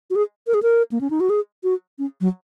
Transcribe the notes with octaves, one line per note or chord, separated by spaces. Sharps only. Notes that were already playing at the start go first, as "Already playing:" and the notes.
F#4
G#4
A#4
G#4
A#4
A#3
C#4
D#4
F#4
G#4
F#4
C#4
F#3